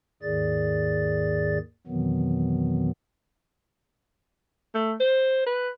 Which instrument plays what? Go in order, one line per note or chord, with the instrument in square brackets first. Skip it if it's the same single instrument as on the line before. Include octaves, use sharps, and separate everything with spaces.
[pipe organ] D#2 G#2 D#3 G#4 D5 A6
F2 B2 D#3 E3 F#3 B3
[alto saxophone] A3
C5
B4